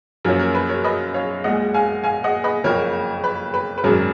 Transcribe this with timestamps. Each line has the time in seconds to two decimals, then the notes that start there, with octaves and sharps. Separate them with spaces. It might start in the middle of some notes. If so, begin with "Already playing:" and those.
0.25 F#2 F3 A#3 C#4 A#4
0.39 A#4
0.55 B4
0.69 A#4 C#5
0.84 B4 D#5
1.14 C#5 F5
1.44 A#1 A#2 G#3 D#5 F#5
1.74 F5 G#5
2.04 F5 G#5
2.24 D#5 F#5
2.44 B4 D#5
2.64 F#1 F2 F3 A#4 C#5
3.24 B4
3.54 B4
3.78 B4
3.84 G#1 F#2 C#3 F#3 A#4